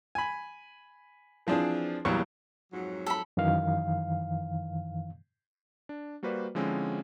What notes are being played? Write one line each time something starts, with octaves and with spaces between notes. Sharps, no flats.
G#5 B5
E3 F3 C4 D4 G#4
A#1 E2 F#3 G3 C#6
F2 G#2 F#3
A4 B5
F#2 D#3 E3 F5
D4
G3 A#3 F#4 B4 C5 D5
D3 F3 G#3 C4 C#4 E4